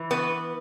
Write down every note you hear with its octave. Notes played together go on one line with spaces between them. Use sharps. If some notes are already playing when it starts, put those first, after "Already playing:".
Already playing: E3
B3